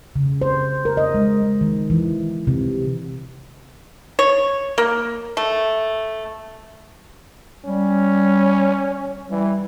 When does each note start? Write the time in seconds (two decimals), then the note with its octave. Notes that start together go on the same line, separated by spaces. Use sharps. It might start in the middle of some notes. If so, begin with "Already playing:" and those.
0.16 C#3
0.42 C5
0.85 A#4
0.97 D#5
1.14 G#3
1.43 G#3
1.61 D#3
1.90 E3
2.47 C3
4.19 C#5
4.78 A#3
5.37 A3
7.65 G3 C#4
9.30 E3 G3